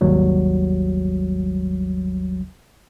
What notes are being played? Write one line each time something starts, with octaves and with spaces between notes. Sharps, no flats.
G#1 D#2 F#3 G3